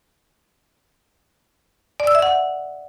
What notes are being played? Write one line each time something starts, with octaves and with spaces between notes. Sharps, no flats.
D5
E6
E5
F#5